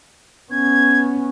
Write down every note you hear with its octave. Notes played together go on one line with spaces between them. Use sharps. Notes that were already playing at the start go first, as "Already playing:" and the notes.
B3 C#4 G#6